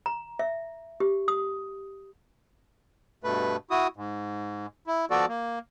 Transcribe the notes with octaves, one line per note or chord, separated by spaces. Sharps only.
A#5
E5
G4
D#6
G2 B2 A3 B4
E4 F#4 D#6
G#2
E4
F3 B3 F#4 A4 D5
A#3